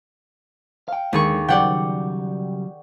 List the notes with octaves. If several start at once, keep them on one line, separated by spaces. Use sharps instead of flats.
F5 G5
D#2 D3 G#3 A#3 G#4 C#6
C#3 F#3 G3 D5 F#5 G5